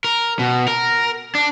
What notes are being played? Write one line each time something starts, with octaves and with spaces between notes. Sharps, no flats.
A#4
B2
A#4
D4